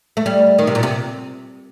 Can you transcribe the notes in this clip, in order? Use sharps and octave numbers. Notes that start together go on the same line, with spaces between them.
A3
G3
D#3
C3
A#2
C3